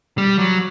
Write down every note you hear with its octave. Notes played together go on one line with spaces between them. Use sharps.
G3
F#3